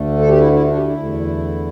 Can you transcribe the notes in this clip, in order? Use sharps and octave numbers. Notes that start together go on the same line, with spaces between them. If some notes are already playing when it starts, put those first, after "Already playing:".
Already playing: D2 D3 A3
A4
G4
E4
E4
D4
G4
E4
E2 D3 A3